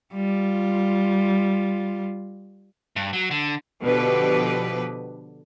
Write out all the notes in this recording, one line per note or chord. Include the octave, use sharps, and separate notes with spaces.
G3 F4
G2
F#3
D3
B2 D3 F3 G4 B4